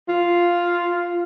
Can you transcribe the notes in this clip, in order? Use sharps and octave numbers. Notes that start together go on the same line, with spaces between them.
F4